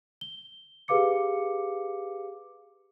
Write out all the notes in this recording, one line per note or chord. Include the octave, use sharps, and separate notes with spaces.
G7
G4 G#4 B4 F5 D6 C#7